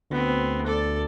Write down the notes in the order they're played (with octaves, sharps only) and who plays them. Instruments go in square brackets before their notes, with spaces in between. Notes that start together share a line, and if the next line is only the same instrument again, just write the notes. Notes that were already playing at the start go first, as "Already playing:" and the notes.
[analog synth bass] D2 [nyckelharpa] B3 C4
[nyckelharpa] A4 D5